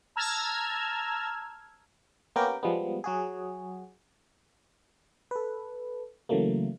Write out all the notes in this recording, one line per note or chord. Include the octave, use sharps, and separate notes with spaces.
A5 A#5 E6 F6 G#6
A#3 B3 C#4 G4 A#4 G5
F3 G3 G#3 B3
F#3 F#4 G#4
A4 B4
C#3 E3 F#3 A3 A#3